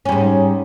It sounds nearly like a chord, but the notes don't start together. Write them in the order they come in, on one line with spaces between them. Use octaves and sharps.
C#4 G3 G#2